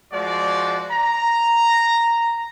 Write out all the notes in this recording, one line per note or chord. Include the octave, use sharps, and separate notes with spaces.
F3 G#3 F#4 D5
A#5